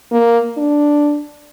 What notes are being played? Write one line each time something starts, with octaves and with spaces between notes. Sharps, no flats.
A#3
D4